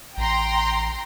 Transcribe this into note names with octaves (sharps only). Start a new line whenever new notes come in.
A1 G5 A#5 C6